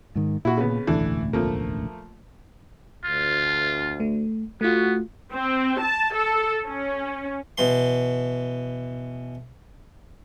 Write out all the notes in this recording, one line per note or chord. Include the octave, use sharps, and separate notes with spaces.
G#2 D#3
A#2 E4 F#4
C#3 B3
E1 A1 D2 E3 A3 D4
F3 A3 A#3
D2 F4
A3
A3 B3 F4 F#4
C4
A5
A4
C#4
B2 E3 C6